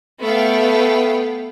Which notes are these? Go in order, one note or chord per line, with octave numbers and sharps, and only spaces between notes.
A3 B3 F5 G5